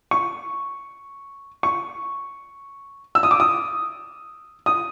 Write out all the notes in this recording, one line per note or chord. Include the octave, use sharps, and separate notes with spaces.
C#6
C#6
E6
D#6
D6
D#6
D#6